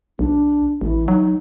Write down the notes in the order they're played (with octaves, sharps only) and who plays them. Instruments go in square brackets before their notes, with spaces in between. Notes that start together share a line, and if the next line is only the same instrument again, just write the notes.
[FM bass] B1 [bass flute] D4
[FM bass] A1 [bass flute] E3
[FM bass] F#3 [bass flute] D#4